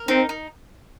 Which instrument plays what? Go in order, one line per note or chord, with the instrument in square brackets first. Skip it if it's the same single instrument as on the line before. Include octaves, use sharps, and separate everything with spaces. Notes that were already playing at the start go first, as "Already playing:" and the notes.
Already playing: [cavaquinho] A#4
[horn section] C4 [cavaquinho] D#4
[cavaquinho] D#4